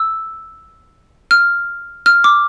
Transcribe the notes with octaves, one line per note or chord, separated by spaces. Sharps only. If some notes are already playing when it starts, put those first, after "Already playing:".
Already playing: E6
F6
F6
D6